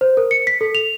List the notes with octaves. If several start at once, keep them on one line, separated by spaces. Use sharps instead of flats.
C5
A#4
C#7
B6
A4
F7